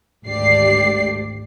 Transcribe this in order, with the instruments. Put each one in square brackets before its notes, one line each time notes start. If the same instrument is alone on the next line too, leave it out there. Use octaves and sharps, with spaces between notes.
[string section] G#1 D2 G4 D5 C7